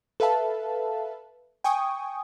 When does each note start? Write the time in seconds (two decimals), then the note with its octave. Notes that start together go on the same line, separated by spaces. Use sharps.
0.20 A4 B4 E5 F5 A5
1.64 G5 G#5 C#6 D#6